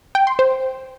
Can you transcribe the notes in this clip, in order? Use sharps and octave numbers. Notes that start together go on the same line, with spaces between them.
G5
C6
C5